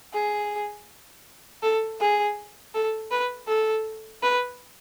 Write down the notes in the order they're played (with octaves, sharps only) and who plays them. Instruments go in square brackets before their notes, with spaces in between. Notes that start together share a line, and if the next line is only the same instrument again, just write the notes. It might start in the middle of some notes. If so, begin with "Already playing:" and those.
[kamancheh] G#4
A4
G#4
A4
B4
A4
B4